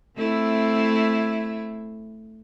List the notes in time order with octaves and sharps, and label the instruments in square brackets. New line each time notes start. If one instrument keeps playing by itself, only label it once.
[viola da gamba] A3 C4 E4